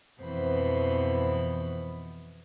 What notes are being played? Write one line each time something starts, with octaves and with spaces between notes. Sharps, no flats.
F2 B2 E3 B3 C5 B5